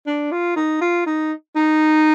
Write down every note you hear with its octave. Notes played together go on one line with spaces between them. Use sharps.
D4
F4
D#4
F4
D#4
D#4